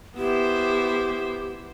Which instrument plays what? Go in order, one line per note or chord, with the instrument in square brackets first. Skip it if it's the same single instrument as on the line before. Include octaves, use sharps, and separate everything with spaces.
[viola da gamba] B3 E4 C5 [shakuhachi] G4